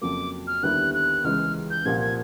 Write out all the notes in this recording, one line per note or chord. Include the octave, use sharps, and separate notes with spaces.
F2 C#3 F#3 A#3 D6
F6
D#2 D3 G3 B3 E4 F#6
F#6
C#2 C#3 E3 G#3 F6
G6
C2 A#2 F3 A#3 G#6
G#6